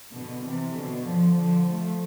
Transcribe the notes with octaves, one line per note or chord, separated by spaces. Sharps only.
B2 D3
C3 E3
B2 D3
D3 F3
D3 F3
F3 A3